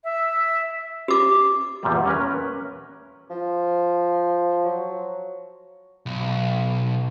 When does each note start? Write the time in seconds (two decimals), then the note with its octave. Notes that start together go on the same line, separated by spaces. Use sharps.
0.04 E5
1.08 G4 D6
1.83 E2 A#2 G3
2.05 C#4 A#4 B4
3.30 F3
4.65 F#3
6.06 B1